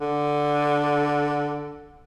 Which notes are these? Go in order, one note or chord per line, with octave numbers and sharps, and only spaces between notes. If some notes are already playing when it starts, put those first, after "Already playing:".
D3